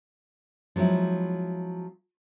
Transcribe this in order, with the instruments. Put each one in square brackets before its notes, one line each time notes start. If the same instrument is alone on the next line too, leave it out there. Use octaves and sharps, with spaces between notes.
[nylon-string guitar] F3 F#3 G#3 C4 E4